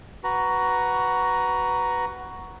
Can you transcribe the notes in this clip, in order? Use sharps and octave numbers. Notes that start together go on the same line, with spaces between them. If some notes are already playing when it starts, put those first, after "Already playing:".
F#4 B4 A#5